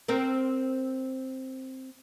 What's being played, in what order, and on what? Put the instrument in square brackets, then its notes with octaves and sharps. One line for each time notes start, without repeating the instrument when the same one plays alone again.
[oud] C4 A#4